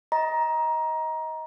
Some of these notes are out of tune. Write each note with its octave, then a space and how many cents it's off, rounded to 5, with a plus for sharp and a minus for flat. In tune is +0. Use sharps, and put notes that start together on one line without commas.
D#5 +20 A#5 +20